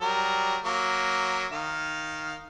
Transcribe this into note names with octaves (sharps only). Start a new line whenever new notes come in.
F#3 G3 A#4
F#3 A#3
D#3 F5